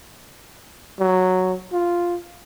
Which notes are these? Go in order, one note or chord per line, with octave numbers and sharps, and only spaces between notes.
F#3
F4